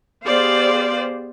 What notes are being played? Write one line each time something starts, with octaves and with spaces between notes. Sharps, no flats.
B3 G4 G#4 C5 D5 F5